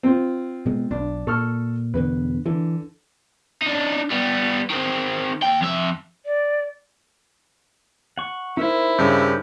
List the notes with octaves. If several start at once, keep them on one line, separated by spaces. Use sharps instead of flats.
C4 F4
B2 G#3
B1 D4
A#2 A4 C#6 F6
E2 B2 D3 B4
D3 E3
D4 D#4
G3 B3
D#3 C4
D#2 G5
F2 E5
D5
F#5 C#6
D#4 E4 A#4 C5
G2 C#3 G4